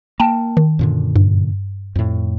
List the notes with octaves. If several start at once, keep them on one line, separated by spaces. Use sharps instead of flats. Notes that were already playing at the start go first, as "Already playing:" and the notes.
A#3 G5 A5
D#3
F#2 A#2 D3
G2
F2 A2